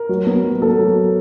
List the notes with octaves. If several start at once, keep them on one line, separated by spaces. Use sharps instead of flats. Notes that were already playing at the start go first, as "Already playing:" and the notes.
Already playing: A#4
F#3
B3
F#3
B3 A4
F#3